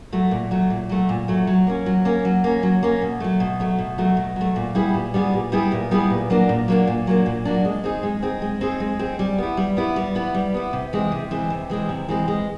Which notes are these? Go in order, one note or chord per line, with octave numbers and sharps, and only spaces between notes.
F#3 A3
A#2
F#3 A3
A#2
F#3 A3
A#2
F#3 A3
F#3
A#3 C#4
F#3
A#3 C#4
F#3
A#3 C#4
F#3
A#3 C#4
B2
F#3 A3
B2
F#3 A3
B2
F#3 A3
B2
F#3 A3
A#2
G3 B3 E4 G#4
A#2
G3 B3 E4 G#4
A#2
G3 B3 E4 G#4
A#2
G3 B3 E4 G#4
A#2
F#3 A#3 D4
A#2
F#3 A#3 D4
A#2
F#3 A#3 D4
A#2
F#3 A#3 D4
G#3
C4 D#4 G#4
G#3
C4 D#4 G#4
G#3
C4 D#4 G#4
G#3
C4 D#4 G#4
G3
B3 E4
G3
B3 E4
G3
B3 E4
G3
B3 E4
C3
E3 G#3 C4
C3
E3 G#3 C4
C3
E3 G#3 C4
C3
E3 G#3 C4
G#3